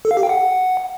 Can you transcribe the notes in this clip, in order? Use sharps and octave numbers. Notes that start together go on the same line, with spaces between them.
A4
F5
G4
G5
F#5